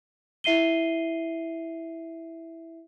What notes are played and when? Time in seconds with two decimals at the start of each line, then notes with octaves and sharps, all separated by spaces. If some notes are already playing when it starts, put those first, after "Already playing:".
0.44 E4 E5 C7 D#7 G7